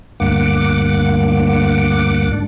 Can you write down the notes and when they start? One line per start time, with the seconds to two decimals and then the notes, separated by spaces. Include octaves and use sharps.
0.20 D2 G2 A#3 F#5 D6
2.32 G#2 D4